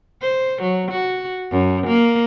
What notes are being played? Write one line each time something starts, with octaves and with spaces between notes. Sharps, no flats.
C5
F#3
F#4
F#2
A#3